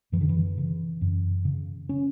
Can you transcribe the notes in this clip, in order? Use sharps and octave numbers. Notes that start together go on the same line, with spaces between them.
F#2 E3
D3
E3
C#3
F#2
C#3
C#4